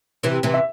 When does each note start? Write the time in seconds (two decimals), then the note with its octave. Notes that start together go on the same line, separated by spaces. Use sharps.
0.23 C3 E3
0.43 C3 E3
0.54 E5